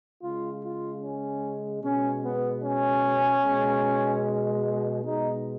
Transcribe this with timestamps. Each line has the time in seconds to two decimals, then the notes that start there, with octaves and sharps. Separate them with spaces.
0.22 C#3 G#3 F4
0.63 F4
1.03 C#4
1.83 B2 G#3 C#4
2.23 B3
2.63 C#4
3.44 B2 G#3
5.04 B2 G#3 D#4